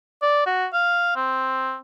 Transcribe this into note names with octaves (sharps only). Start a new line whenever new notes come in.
D5
F#4
F5
C4